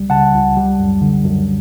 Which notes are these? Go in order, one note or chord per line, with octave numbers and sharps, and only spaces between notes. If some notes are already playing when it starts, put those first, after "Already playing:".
Already playing: C#2 G3
C#3 F#5 A5
C#2
G3
F#2
D3
F#2